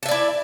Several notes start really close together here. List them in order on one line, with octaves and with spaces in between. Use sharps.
A5 E5 D5 E4